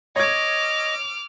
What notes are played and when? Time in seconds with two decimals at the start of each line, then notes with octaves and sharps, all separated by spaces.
0.16 C#5 D#5 D6 F6 G#6